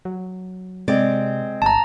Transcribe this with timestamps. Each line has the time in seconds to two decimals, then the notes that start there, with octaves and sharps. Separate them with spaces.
0.05 F#3
0.88 C3 G#3 C4 D5
1.62 G1 A5 A#5